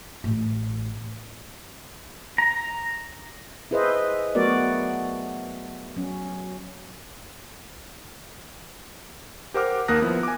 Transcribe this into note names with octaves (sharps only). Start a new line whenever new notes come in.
A1
A#5
E4 G#4 B4 C5 D#5 E5
F#3 A3 B3 F#4 A#4 D5
F#3 C#4
G4 A#4 C5 F#5 D6 F6
D#2 A#3 A#4 D#6 F#6 A#6
F3 B3 E4
G#5 D6